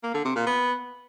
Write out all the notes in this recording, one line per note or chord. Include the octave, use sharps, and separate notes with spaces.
A#3
D3
C3
A#2
B3